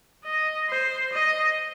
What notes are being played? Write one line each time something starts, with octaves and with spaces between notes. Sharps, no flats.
D#5
C5
D#5